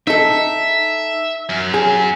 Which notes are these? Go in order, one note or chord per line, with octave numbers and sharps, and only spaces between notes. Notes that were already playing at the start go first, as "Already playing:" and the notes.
D#4 A4 E5
F#2
G#4